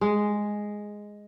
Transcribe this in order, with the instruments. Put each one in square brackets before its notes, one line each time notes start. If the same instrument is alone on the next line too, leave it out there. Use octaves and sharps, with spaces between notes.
[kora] G#3